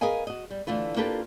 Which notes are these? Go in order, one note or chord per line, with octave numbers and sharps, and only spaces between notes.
G#4 A#4 B4 D#5 F5 G#5
F#4 D#5
G3
D3 E3 A3 F4 B4
A#3 D4 F4 G4 A4 B4